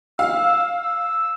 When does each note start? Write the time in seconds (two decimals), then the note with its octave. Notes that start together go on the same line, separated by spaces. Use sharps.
0.19 F5 E6
0.83 E6